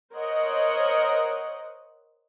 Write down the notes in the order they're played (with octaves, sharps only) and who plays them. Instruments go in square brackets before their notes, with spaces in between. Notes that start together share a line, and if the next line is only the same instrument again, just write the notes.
[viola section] A#4 C5 C#5 D#5 F#5